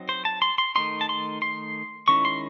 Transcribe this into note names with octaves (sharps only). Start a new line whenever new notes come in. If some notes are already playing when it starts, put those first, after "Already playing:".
Already playing: F#3 C4 D#4
C5
A5
C6
C6
D#3 A3 D#4 C6
A5
C6
C6
D#3 G#3 C#4 E4 C#6
C6